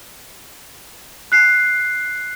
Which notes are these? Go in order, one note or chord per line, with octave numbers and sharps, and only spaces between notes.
F#6 C7